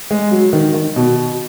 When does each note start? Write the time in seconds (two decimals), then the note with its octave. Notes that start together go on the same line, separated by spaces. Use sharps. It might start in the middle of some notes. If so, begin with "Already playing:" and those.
0.11 G#3
0.31 F#3
0.53 D#3
0.74 D#3
0.96 B2